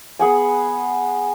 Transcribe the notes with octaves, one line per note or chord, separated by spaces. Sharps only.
B3 G#4 F#5 G#5